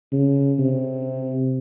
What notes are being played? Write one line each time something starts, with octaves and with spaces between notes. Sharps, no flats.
C#3
C3